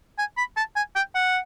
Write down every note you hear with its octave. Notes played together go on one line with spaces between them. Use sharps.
G#5
B5
A5
G#5
G5
F#5